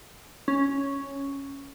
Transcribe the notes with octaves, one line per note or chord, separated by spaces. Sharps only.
C#4